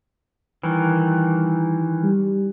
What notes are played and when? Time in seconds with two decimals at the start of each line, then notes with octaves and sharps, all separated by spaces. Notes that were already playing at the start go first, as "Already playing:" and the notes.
0.63 D#3 E3 G3
2.03 G3